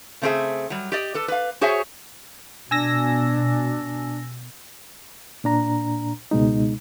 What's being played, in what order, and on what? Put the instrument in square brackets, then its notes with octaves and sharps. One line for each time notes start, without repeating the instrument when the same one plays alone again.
[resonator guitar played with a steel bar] C#3 A3 C4 D4 G#4 E5
F#3 G3
G4 D5 D#5
A4 B4
B4 F5
F#4 G#4 C5 C#5 E5 G#5
[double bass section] B2 [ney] D4 [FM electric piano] G#5 E6 A#6
[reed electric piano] A#2 D4 A#5
C#2 B2 G#3 D#4